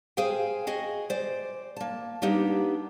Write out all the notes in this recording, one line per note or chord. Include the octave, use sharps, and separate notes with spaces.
G#4 C5 F5 G5 G#5
F#4 G#4 D#5
C5 D5
A#3 A5
G3 A#3 B3 D4 D#4 G4